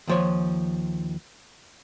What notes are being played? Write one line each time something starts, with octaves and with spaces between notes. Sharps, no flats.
D#2 F3 C#5